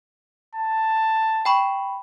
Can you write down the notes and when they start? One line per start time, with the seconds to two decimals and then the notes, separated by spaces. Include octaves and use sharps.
0.55 A5
1.45 G5 B5 C#6